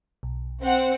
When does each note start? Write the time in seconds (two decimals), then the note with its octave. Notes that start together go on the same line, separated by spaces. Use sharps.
0.23 B1
0.63 C4 F#5